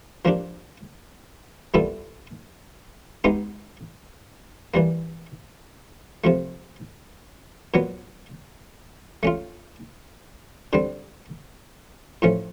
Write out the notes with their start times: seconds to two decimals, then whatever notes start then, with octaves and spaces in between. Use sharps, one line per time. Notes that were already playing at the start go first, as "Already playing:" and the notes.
0.25 F3 A#3 D4 G4
1.74 A#2 G3 B3 E4 A4
3.24 G#3 B3 D#4 G4
4.74 E3 G3 A#3
6.24 C3 F3 A3
7.74 A#2 F#3 B3
9.23 A3 C#4 F4
10.73 D3 G3 C4
12.22 A2 F3 A3 C#4